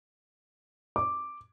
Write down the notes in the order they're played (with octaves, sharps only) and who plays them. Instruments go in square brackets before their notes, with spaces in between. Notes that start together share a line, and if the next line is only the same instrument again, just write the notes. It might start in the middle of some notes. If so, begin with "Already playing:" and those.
[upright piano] D6